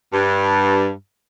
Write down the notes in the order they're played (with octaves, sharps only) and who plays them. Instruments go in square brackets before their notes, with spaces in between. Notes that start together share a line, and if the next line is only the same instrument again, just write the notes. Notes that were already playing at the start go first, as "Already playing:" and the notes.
[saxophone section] G2